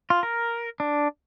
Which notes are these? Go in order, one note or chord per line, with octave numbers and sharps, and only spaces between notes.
F4
A#4
D4